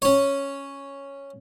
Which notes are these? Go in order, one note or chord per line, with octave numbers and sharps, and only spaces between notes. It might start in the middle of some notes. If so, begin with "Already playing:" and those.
C#4 C#5